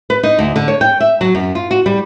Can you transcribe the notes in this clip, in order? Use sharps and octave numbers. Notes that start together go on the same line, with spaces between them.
B4
D#4
D2
D3
C#5
G5
E5
F#3
F#2
F4
F#4
G3